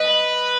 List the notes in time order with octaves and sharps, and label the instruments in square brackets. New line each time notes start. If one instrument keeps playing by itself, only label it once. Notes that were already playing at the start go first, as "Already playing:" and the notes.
Already playing: [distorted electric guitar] B4 [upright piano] D#5